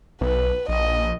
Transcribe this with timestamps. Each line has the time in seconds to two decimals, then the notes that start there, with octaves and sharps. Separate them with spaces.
0.21 B1 B4
0.69 A#1 D#5